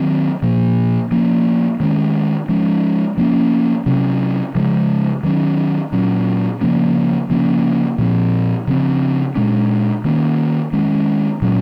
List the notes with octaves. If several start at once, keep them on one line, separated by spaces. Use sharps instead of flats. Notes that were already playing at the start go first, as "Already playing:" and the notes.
Already playing: D#3 F#3 C4
A#2 F3 A#3
F3 A#3 C#4
D#3 G#3 C#4
F3 G#3 C#4
F3 A#3 C#4
C3 F#3 C#4
C#3 F3 G#3
D#3 F#3 A#3 C#4
A#2 F#3 C#4
C#3 F3 A#3 C#4
C#3 F3 A#3 C#4
A#2 F3 C4
C#3 F3 C4
A#2 G#3 C#4
D#3 A#3 C#4
D#3 G#3 C#4
A#2 F#3 C#4